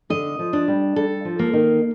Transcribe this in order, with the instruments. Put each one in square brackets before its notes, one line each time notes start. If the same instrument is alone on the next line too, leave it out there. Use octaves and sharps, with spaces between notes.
[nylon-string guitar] D3 [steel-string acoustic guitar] D#5
[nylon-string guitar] F3
[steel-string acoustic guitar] D4
[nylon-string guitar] G3
[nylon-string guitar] G3 [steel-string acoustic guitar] A4
[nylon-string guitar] F3
[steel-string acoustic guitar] A#3
[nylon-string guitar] D#3